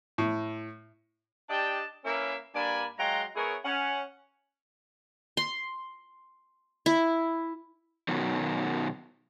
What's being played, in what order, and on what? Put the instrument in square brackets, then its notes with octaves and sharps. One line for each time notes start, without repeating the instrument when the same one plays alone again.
[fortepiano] A2
[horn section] D4 G4 D5 D#5 G5 A5
A#3 C#4 E4 A#4 B4 E5
G2 A#3 D4 D5 G#5 B5
F#3 G#3 F5 G5 A#5 C6
B3 E4 G#4 A#4 C#5
C#4 F#5
[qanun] C6
E4
[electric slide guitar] B2 D#3 F#3